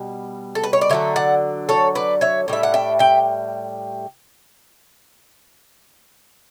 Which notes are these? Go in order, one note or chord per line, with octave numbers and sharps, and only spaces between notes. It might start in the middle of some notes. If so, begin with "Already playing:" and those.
Already playing: B2 G3
A4
B4
C#5
D5
D3 F#3 A3 C#5 E5
D5 F#5
A4 C#5
B4 D5
C#5 E5
A2 G3 E5
F#5
E5 G5
E5 G5